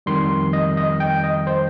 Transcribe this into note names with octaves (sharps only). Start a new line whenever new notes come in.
F2 D#3 G3 C6
D#5
D#5
G5
D#5
C5